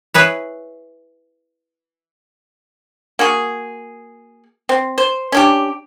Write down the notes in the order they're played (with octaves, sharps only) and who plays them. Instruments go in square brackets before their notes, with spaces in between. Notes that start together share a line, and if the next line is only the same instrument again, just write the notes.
[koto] E4 G#4 B4 C#5
[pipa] A#3 F#4 G#4
C4
C5
C#4 D4 G4